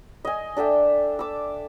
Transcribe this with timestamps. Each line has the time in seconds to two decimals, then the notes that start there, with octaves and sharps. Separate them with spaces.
0.25 D#5 G#5
0.57 D4 A4 E5 G5
1.19 D6 E6